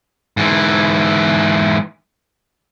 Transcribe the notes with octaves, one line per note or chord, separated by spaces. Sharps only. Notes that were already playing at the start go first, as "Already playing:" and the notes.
G#2 E3